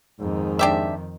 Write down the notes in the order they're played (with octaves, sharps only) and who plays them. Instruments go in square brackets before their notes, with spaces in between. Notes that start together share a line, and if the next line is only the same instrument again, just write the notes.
[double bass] F2 D#3 [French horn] G#2
[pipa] D4 G4 E5